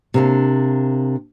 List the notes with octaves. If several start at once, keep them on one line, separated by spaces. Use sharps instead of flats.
C3 A#3 D4